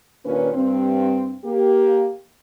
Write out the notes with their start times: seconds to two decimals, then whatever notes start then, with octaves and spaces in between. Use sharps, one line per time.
0.23 D#2 A#2 C#4 D4 B4
0.53 G2 C4
1.44 A#3 G4